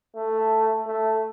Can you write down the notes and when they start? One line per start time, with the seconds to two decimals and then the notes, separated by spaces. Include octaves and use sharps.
0.16 A3
0.87 A3